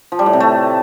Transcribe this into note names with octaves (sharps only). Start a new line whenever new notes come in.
F3
G3
A2
C3
A3